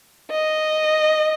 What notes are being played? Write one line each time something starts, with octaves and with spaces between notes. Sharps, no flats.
D#5